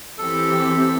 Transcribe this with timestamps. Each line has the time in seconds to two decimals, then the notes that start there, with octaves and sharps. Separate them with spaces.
0.18 E3 C4 G4 A4